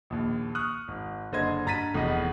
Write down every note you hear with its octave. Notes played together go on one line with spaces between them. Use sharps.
A#1 D#2
C#6 D#6 F6 F#6
G#1
F#1 D3 C5 D#5 G#6
G2 A#5 A6 B6 D#7
F1 E2 D#5